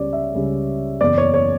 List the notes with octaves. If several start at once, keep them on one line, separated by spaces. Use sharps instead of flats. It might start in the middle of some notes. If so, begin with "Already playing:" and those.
Already playing: C#2 C#3 G3 C#4 C#5 D5
E5
C#2 C#3 G3 C#4
F#1 E2 C#3 E3 D5
C#5
C#5